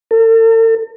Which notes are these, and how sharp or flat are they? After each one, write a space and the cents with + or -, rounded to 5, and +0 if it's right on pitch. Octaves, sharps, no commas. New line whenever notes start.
A4 +45